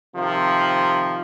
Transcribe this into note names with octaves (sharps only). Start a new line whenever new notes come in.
C3 D#3 F3